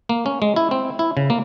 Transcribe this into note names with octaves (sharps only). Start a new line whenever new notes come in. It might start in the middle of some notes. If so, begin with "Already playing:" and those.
A#3
C#4
G#3
E4
C4
E4
C#3
A#3